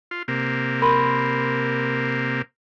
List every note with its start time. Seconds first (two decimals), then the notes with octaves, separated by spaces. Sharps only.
0.11 F4
0.28 C3 A#3
0.82 A#4 B5 C6